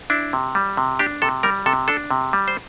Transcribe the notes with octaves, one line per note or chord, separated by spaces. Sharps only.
D4 E4
C3
G3
C3
D4 G4
C3 A4
G3 A#4
C3 A4
D4 A4
C3
G3
C5